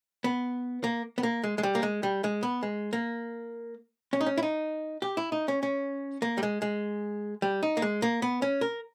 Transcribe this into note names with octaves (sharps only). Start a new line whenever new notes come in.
B3
A#3
B3
A#3
G#3
G#3
G3
A#3
G#3
G3
G#3
B3
G#3
A#3
C#4
D#4
C#4
E4
D#4
G4
E4
D#4
C#4
C#4
A#3
G3
G#3
G#3
G3
D#4
A#3
G#3
A#3
B3
C#4
A#4